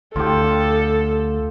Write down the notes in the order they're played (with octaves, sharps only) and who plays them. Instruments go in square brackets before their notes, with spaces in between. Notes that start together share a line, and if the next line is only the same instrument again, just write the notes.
[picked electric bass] D2 [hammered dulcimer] F4 G4 [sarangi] A4